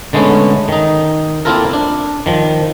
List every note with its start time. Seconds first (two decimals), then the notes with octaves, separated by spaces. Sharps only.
0.13 D3 G#3 A3 B3 C#4
0.68 D#3 D#4
1.45 A#3 C4 E4 F4 A4 A#4
1.73 D4
2.26 D#3 F3